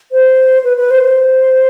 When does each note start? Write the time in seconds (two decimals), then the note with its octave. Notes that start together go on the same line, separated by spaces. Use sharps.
0.12 C5
0.64 B4
0.77 B4
0.91 C5
1.03 C5